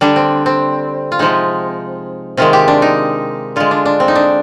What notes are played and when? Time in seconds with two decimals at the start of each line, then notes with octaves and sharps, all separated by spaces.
0.01 D3 G3 D4
0.16 C4
0.46 C4
1.12 F4
1.19 C3 F3 G#3 D#4
2.37 C3 D#3 G#3 F4
2.53 G4
2.68 D4
2.82 D#4
3.56 D3 G#3 F4
3.71 D4
3.86 D4
4.00 C4
4.08 D#4
4.15 D4